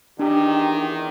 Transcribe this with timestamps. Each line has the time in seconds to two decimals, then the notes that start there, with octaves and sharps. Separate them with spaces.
0.19 E2 D#3 D4 G4